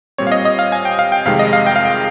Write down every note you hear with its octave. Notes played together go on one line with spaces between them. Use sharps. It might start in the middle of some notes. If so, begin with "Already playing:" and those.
A#2 G3 C4 C#5
F5
D#5
D#5
F5
G#5
G5
F5
G5
F2 C3 D#3 G#3 F5
D#5
F5
G5
F5
G5